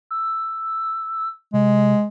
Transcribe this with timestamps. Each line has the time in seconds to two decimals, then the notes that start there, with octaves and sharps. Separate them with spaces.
0.11 E6
1.54 C3 G#3